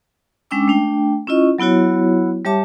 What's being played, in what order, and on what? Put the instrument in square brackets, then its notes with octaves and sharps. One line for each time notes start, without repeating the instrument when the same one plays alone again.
[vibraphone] G#3 C#4 D4 G5 D6 E6
A3 D4 G5
C#4 E4 F4 D#5 C#6
F#3 B3 E4 F#4 C#5
G3 G4 C#5 E5 A5 D6